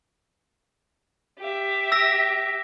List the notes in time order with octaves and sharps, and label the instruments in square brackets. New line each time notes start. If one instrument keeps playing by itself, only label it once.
[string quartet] G4 E5
[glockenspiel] E6 A#6 B6